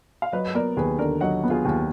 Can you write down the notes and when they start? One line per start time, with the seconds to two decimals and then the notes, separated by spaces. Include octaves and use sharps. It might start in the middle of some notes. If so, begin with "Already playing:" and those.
0.22 F5
0.32 F#3 B4 D#5
0.54 B3 A#4 D5
0.77 D#2 G#4 B4
0.98 D3 A#4 D5
1.21 F#3 D#5 F#5
1.44 B3
1.50 F4 G#4
1.65 D#2